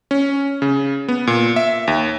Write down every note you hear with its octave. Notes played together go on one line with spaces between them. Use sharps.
C#4
C#3
B3
A#2
E5
D#2